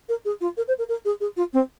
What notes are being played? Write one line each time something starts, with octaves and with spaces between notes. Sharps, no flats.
A#4
G#4
F4
A#4
C5
A#4
A#4
G#4
G#4
F4
C4